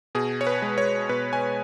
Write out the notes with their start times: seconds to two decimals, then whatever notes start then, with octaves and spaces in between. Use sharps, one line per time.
0.15 B2 G#4
0.41 C#5
0.47 B4
0.62 G#3
0.78 C#5
1.09 B2 B4
1.33 G#5